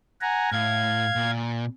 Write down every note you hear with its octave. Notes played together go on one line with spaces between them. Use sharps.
F#5 G#5 A#5
A2 F5 G#6
A#2